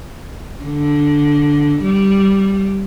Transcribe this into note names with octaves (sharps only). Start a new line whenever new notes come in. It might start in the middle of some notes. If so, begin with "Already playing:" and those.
D3
G3